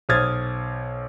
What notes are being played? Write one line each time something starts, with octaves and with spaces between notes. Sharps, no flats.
B1 C5 D#6 F6 G#6 A6